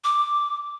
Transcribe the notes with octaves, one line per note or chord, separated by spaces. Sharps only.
D6